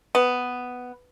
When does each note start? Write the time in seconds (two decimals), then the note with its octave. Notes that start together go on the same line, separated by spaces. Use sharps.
0.15 B3